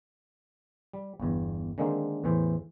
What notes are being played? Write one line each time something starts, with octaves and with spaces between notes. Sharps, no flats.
G3
G1 E2
D3 D#3 G#3 A#3 C4
E2 A2 E3 C5